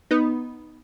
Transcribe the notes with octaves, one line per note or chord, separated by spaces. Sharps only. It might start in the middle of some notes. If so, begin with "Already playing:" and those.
B3 D#4